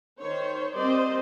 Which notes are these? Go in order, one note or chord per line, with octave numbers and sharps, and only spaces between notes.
D#3 C5 C#5
G3 C4 A#4 C5 D5 D#5